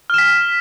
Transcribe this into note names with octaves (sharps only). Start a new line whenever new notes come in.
F6 B6 E7